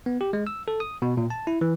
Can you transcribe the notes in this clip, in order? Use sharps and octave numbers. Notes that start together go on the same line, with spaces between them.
B3
G4
G#3
E6
A4
D#6
B2
A#2
A5
E4
E3